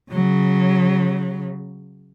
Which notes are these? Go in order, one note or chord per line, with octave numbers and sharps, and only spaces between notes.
C#3 F#3